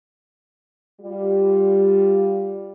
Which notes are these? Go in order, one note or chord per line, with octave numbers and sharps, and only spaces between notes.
G3 F4